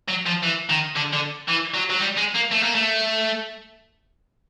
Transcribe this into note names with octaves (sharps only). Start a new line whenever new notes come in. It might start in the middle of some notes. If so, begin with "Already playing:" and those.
F#3
F3
E3
D#3
D3
D3
E3
F#3
F#3
G3
G#3
A#3
A3
A#3
A3